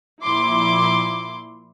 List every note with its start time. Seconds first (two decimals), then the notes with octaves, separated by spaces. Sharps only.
0.24 A#2 F3 E4 C6 D6